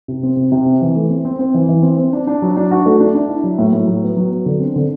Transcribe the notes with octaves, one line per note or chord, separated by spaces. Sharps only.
C3
C4
C3
C3
C4
E3
A3
C4
C4
C4
E3
E3
C4
C4
D4
D4
F#3
D4
F#4
A3
D4
D4
E4
F#3
A2
A2
F#3
B3
F#3
B3
D3
C4
D3